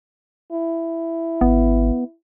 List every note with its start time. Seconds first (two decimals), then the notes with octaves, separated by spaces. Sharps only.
0.52 E4
1.41 G#1 B3